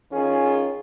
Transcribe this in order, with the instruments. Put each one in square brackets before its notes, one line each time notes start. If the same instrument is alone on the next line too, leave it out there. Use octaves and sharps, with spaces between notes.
[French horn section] D#3 F4 G#4 [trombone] C#4